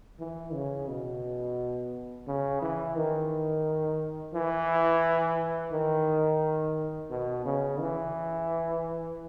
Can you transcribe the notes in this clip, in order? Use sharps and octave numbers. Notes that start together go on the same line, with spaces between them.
E3
C#3
B2
C#3
E3
D#3
E3
D#3
B2
C#3
E3